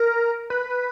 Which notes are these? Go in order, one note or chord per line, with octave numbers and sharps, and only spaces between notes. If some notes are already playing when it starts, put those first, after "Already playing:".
Already playing: A#4
B4